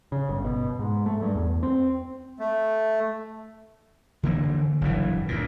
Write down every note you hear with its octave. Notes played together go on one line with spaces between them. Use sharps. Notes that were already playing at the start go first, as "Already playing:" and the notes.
C#3
G1
B2
G#2
A3
G2
E2
C4
A3
D3 E3 A#3
F#1 G2 E3
D2 A#2